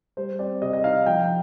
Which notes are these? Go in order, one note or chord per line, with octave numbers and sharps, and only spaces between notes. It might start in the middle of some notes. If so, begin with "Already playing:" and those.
G3 C5
C4 D5
C3 D#5
D#5
D#4 F5
F3 G5